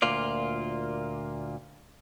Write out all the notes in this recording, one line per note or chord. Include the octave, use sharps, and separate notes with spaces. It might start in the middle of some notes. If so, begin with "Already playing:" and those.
D2 A#2 A#3 F4 D5